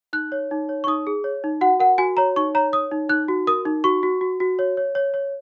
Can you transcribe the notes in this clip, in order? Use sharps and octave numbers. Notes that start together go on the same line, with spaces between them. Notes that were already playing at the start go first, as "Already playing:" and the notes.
D#4 F#6
C#5
D#4
C#5
C#6
D#4 D#6
G#4
C#5
D#4
F#4 F#5
A#4 F#5
F#4 G#5
C#5 A#5
D#4 C#6
C#5 A#5
C#5 D#6
D#4
D#4 F#6
F#4
A#4 D#6
D#4
F#4 C#6
F#4
F#4
F#4
C#5
C#5
C#5
C#5